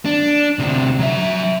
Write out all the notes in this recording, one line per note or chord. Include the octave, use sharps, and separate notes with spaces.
D4
D2 C3
F#3 E5